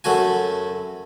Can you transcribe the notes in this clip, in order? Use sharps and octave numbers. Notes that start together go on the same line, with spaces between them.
F#2 F#3 A3 F#4 G#5